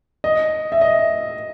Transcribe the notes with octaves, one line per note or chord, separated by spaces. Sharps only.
D#5
E5
D#5